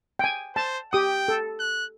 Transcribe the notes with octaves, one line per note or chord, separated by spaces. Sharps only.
G5 G#5
C5 A5
G4 G5 D#6
A4
F#6